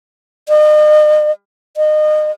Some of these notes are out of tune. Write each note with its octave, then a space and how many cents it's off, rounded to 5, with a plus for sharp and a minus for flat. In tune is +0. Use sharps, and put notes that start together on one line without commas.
D#5 -40
D#5 -30